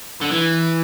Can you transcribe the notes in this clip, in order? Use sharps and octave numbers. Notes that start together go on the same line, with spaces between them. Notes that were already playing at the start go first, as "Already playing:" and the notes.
D3
E3